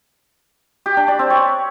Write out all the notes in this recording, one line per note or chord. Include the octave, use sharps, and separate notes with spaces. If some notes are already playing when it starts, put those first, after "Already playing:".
G4
D4
D5
C4
C#5